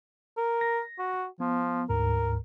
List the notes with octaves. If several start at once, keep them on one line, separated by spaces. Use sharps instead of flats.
A#4
A#6
F#4
F3 B3
D2 G#2 A#4